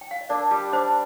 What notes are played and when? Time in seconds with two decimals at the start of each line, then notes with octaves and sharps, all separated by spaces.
0.01 G5
0.11 F5
0.21 D#5
0.30 D4 A#4 D5
0.51 G3
0.72 D4 C5 D#5